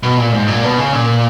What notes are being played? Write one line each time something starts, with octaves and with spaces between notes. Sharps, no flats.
B2
A#2
G#2
A#2
B2
C#3
A#2